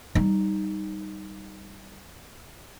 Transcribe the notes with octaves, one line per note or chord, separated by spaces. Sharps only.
G3 D#4